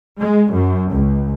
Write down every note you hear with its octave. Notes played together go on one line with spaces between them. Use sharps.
G#3
F#2
C#2